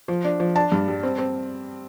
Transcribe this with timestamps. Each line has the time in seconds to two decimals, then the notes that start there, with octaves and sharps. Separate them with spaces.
0.08 F3
0.24 D4
0.40 F3
0.55 D4 A5
0.72 G2
0.88 G3
1.03 C4
1.18 C4